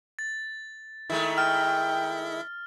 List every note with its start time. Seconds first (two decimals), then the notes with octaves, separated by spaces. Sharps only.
0.19 A6
1.10 D#3 G#3 A3 E4 E5
1.38 G5 F6